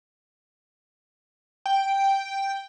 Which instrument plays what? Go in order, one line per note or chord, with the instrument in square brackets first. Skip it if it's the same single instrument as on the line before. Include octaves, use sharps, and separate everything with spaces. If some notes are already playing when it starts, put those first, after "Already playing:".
[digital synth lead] G5